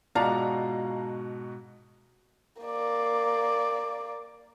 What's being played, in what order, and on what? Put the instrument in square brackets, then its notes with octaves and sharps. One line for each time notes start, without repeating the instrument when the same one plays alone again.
[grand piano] G#2 B2 F#4 [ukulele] F4 D5 [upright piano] F5 A5 A#5
[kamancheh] A#3 D5